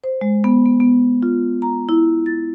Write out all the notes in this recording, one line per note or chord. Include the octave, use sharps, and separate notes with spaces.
C5
G#3
B3
B3
B3
F4
A#5
E4
A6